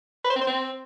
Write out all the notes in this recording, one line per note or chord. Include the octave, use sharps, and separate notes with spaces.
B4
C5
C4
C5
C4